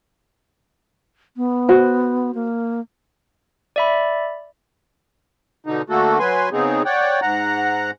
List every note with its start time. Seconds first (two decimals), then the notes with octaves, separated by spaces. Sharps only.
1.37 B3
1.69 F#4 C5
2.35 A#3
3.76 D5 E5 B5
5.66 B2 D3 D#4
5.89 D3 A3 A#3 F#4 A4
6.19 F#3 B4 G#5 C6
6.53 C#3 B3 C4 D#4 G#4
6.85 C#5 D5 F#5 G5
7.22 G#2 F#5 A#5